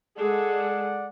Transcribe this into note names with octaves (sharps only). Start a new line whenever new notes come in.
G#3 G#4 A4 D5 F#5